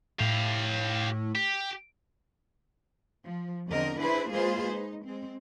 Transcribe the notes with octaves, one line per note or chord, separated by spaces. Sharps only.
A2 G4 F5
G4
F3
E2 D3 C4 A#4 D#5
D4 E4 G#4 B4 C5
G#3 A#3 F4 G#4 B4 C5
D#4
G#3 C4